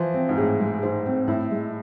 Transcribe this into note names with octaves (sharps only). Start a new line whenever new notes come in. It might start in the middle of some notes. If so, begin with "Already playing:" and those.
Already playing: E3 F3 C5
C4
G#2
A2 G#4
G#3
G#2 C5
C4
A2 E4
G#3